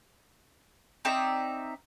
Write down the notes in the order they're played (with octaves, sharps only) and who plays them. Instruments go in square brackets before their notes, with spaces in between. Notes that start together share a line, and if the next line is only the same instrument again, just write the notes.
[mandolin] C4 D#4 D5 E5